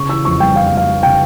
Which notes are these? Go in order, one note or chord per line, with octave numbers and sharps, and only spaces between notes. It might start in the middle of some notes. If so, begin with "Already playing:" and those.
Already playing: C#3 C#6
E3 E6
F2 C#6
G3 G5
F2 F5
F5
G3
F5
G3
C#3 G5